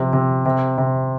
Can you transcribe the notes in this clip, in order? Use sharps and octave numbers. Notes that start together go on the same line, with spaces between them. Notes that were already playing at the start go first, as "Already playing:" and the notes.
Already playing: C3 F3
C3
C3
C3